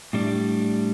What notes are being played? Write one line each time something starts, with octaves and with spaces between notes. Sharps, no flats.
A2 G3 D4